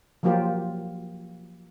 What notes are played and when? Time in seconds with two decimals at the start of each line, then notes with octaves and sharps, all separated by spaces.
0.23 F3 F#3 A#3 F4 G4 C5